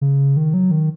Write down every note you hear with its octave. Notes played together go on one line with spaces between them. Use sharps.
C#3
D#3
F#3
D#3